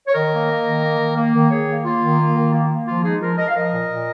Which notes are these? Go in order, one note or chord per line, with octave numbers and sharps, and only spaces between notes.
C#5
D#3 A#4 D#5
A#3
A#3
D#3
A#3
D#3
A#3
D#3
D#3 G#4 C#5
A#3
A#3 F4
D#3
A#3
D#3
A#3
A#3
F3 F4
G#3 D#4 G#4
F3 F4 A#4
F3 A#4 D#5
F5
F3 A#4 D#5
A#2
A#2